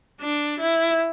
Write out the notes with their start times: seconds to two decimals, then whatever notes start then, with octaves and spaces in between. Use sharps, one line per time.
0.21 D4
0.59 E4